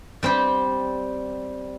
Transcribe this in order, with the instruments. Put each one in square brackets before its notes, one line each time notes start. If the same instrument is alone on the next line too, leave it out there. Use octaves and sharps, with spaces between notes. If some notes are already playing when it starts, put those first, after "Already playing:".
[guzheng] G3 C4 G4